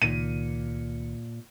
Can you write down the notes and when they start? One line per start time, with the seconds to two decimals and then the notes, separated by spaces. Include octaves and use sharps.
0.02 C#2 A#2 D#3 C#7 D#7